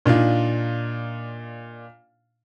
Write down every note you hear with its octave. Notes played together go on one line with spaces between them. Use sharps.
A#2 D4 D#4 F4